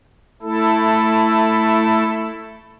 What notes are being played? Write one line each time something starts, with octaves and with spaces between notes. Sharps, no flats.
A3 E4 A4